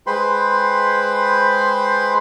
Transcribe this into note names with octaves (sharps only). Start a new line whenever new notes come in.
G#3 B4 C5 G5 B5 C6